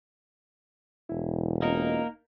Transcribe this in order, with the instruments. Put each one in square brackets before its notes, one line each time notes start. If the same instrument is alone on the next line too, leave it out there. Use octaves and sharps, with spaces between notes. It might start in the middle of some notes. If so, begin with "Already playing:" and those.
[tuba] E1 [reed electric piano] E4
[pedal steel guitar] A#3 D#4 A#4 [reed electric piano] C#4 F4 D#5